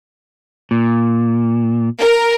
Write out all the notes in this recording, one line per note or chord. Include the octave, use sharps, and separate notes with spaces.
A#2
A#4